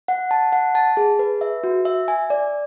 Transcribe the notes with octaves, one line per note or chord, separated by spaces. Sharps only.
F#5
A5
F#5
A5
G#4
B4
E5
F#4
E5
G#5
D5